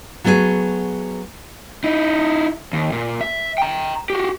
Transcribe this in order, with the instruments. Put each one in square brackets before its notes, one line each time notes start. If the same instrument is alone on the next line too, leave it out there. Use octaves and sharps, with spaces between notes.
[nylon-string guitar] F#3 A3 B3 G4 G#4
[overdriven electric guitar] D#4 E4
D#2
A#2
E5
G5 A#5
F#4 G4